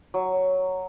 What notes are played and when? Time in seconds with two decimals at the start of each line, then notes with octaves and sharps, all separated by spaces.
0.14 F#3